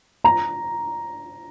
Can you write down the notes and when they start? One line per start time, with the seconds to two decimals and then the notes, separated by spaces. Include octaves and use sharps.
0.24 A#5